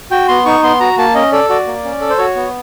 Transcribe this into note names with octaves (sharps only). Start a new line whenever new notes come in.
F#4 G5
B3 C6
D#4 C#6
B3 C6
F#4 A#5
A#3 A5
C#4 D#5
A4 D5
F#4 D5
A#3
C#4
A4
C5
F#4 C#5
B3